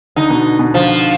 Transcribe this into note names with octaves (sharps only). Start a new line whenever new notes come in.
D3 D#4
B2
B2
D3 F3